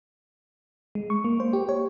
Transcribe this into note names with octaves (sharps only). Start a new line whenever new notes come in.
G#3
C#6
A#3
C5
G4
C#5